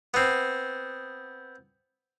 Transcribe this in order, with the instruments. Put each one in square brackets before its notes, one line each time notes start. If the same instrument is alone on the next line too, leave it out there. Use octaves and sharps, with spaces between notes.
[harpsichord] B3 C4